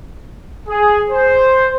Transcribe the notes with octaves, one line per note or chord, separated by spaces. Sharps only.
G#4
C5